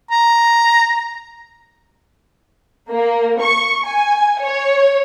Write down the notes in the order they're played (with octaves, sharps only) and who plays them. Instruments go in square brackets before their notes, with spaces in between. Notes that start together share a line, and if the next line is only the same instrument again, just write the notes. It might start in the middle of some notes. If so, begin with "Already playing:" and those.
[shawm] A#5
[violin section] A#3
C#6
G#5
C#5